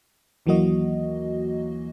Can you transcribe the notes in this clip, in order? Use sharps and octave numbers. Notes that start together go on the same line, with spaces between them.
D#2 E3 F#3 A#3 F#4 D#5